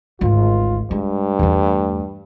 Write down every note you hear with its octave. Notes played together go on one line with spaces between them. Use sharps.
G#1 D2 F4
G2 G#3
E2 A3